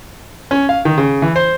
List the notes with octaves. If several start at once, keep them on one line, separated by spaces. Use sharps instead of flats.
C#4
F5
D#3
C#3
E3
C5